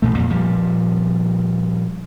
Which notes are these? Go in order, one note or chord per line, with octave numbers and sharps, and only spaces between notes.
A1 A#2 A3
F2 A#2
A#2 F3 G3